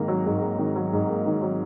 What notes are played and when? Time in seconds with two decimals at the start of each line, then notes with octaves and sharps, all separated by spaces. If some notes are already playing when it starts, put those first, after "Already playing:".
Already playing: G#2 D#3 A#3
0.08 F#3
0.25 G#2
0.43 A#3
0.58 D#3
0.76 F#3
0.93 G#2
1.09 A#3
1.26 D#3
1.42 F#3